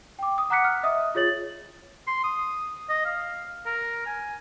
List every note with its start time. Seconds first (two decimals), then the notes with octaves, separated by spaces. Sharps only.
0.19 G5 D6
0.38 D#6
0.50 F#5 A#5 D6 F#6 B6 C#7
0.64 F6
0.83 D#5 E5 D#6
1.15 F4 G#4 C#5 A6 F#7
2.07 C6
2.24 D#6
2.90 D#5
3.05 F5
3.66 A#4
4.06 G#5